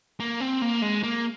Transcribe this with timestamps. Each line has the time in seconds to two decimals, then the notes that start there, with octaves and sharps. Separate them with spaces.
0.20 A#3
0.41 C4
0.62 A#3
0.82 G#3
1.03 A#3